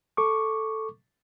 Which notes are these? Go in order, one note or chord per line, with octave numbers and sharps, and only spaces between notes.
A4 C#6 D6